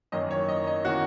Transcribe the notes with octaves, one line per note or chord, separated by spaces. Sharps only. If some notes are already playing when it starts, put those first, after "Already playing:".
F#2 D#3 A#3 C#4 D#5
C#5
D#5
D#5
D#3 A#3 C#4 F#4 F#5